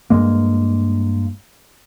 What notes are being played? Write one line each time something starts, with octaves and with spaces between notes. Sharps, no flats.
G2 G#3 A#3